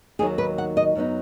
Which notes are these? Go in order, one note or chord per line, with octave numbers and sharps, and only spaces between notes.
D#2 D#3 F#3 G#4
B4
F#5
D#5
F#2 F#3 B3 D#4